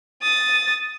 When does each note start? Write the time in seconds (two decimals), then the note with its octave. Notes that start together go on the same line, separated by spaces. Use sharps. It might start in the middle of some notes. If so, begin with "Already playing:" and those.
0.23 D#6 A6